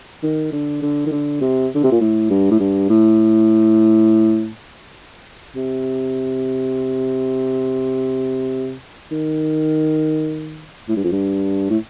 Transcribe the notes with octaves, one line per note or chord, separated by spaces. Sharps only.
D#3
D3
D3
D#3
D3
C3
D3
C3
A#2
A2
G2
A2
G2
A2
C3
D#3
A2
G2
F2
G2
A2